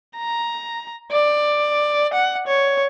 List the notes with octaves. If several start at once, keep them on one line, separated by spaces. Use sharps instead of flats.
A#5
D5
F#5
C#5